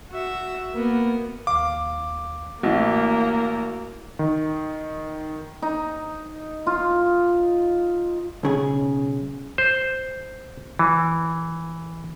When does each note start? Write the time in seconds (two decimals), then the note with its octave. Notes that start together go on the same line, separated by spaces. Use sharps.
0.10 F#4 E5
0.74 A#3 B3
1.47 D#2 F5 D6
2.63 A1 A#3 E4 F#4
4.19 D#3
5.62 D#4
6.67 F4
8.43 B1 C#3 G#4
9.58 C5
10.79 E3